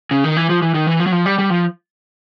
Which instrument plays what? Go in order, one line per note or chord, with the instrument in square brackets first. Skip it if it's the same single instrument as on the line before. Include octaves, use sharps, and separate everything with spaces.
[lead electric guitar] C#3
D#3
E3
F3
E3
D#3
E3
F3
F#3
F3
G3
G3
F3